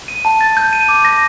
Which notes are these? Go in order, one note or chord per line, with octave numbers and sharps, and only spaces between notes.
D#7
A5
A6
G6
D#7
D6
A#6